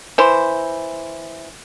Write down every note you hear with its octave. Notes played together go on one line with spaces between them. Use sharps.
E3 C5